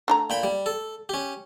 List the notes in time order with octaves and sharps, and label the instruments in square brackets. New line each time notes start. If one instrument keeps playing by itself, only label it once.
[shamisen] D3 A3 A#5
[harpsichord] A#2 G5 B5
G3
A4
C#4 G4